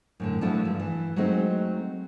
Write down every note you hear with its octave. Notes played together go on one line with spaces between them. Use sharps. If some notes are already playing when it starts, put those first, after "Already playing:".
F#2 A2 D3
F3 F#3 A3 D4 E4 F#4
G2
E3
F#3 G#3 A3 C4 D#4